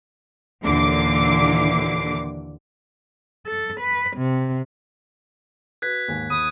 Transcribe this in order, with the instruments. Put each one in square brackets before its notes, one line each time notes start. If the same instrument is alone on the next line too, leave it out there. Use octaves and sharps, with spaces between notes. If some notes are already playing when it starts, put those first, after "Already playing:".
[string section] D#2 A#2 D3 E3 D6 C7
[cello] A4
B4
C3
[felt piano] F#4 B4 [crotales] F#6 G#6 B6
[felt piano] D#2 G#2 G#5
[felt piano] D#2 B5 D#7 [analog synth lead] D#6